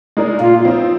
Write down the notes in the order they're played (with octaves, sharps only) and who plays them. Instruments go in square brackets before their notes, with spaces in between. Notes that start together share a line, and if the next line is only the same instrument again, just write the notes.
[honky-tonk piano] G#3 D#4 A#4 D5
[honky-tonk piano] A#2 [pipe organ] F4
[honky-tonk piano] F3 C4 D#4